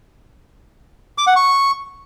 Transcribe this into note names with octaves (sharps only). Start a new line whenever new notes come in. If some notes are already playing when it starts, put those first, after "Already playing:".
D6
F#5
C#6